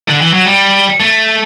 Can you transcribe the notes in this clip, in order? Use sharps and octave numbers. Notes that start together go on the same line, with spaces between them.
D3
E3
F#3
G3
A3